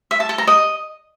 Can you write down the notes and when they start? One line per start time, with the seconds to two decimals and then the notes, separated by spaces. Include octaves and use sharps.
0.11 E5
0.20 A5
0.29 A4
0.38 A#5
0.47 D#5